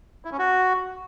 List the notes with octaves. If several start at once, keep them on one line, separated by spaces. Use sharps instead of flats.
E4
C#4
F#4